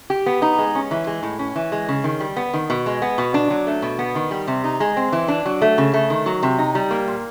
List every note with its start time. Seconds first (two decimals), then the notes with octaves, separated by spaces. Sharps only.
0.10 G4
0.26 B3
0.42 D#4
0.58 G#3
0.75 C#4
0.91 E3
1.07 G#3
1.23 A2
1.39 C#4
1.56 E3
1.72 G#3
1.89 C#3
2.04 D#3
2.20 G3
2.37 B3
2.54 D#3
2.70 B2
2.86 G#3
3.02 B3
3.18 B2
3.34 D4
3.50 F#3
3.67 A3
3.82 B2
3.99 B3
4.15 D#3
4.31 G3
4.47 C3
4.64 D#4
4.80 G#3
4.97 C4
5.12 E3
5.28 D4
5.45 F#3
5.62 A3
5.78 C#3
5.94 A3
6.10 D#3
6.26 F#3
6.43 C3
6.59 D#4
6.75 G3
6.91 A#3
7.08 A#2